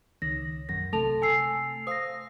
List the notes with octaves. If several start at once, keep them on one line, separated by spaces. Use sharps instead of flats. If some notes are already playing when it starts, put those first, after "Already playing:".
C#2 D#3 A#6
A#1 F#2 A#6
C3 A3 A4 A5 F7
G#5 E6 C7
C5 F5 D#6 A#6